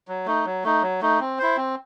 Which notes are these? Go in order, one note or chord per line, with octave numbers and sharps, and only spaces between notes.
F#3
A3 D#4
F#3
A3 D#4
F#3
A3 D#4
C4
E4 C5
C4